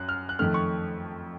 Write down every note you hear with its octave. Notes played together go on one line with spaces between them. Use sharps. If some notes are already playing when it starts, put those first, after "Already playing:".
Already playing: F#2 F#6
F6
F#6
F2 D#3 A3 F6
C#6